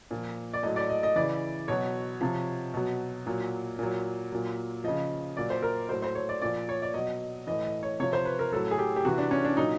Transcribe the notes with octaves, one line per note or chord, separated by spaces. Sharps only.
A#2 F3
D5
A2 F#3 D#5
D5
D#5
D#5
C#3 E3 D5
B2 F#3 C#5
C3 F3
B2 F#3
A#2 F#3
A#2 F#3
A#2 F#3
C#3 F3 D#5
A#2 F#3 D5
C5
A#4
A2 F#3 C5
C5
C#5
D5
A#2 F3 D5
C#5
D5
B2 F#3 D#5
A2 E3 D#5
D#5
C#5
C3 F3 C#5
C5
B4
A#4
A2 F#3 A4
G#4
G4
G4
C3 E3 F#4
D4
C#4
D4
A#2 F#3 D#4